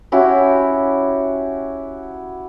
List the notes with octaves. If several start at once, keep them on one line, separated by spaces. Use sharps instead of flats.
C#4 E4 F#4 G4